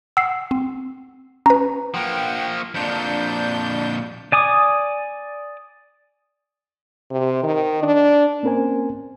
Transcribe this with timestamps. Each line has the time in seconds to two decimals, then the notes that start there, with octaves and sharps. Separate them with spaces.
0.17 F#5 E6 C7
0.51 C4
1.46 C#4 B4 A#5
1.94 F3 A#3 F#5 G5
2.74 F2 A#2 D4 G6
4.32 D5 G#5 D6 D#6
7.11 C3
7.43 D#3
7.83 D4
8.43 A#3 C4 C#4 A#4 C5 G#5